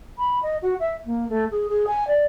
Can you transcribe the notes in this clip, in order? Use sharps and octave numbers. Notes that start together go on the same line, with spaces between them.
B5
D#5
F#4
E5
A#3
A3
G#4
G#4
G#5
D5